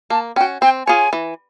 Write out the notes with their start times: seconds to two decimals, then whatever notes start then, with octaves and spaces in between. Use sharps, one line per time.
0.10 A#3 A5
0.36 C#4 G5
0.40 F#4
0.62 C4 G5
0.86 F4 G#4 C#5 G#5
1.13 E3